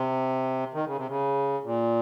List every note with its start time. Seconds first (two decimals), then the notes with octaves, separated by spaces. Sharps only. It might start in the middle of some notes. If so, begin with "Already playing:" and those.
Already playing: C3
0.74 D#3
0.86 C#3
0.96 C3
1.08 C#3
1.64 A#2